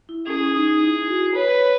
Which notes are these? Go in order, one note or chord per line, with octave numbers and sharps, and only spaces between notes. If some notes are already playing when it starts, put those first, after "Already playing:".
E4
C#4 G#4
C#4
D#4
D#4
E4
F#4
B4 C#5
C#5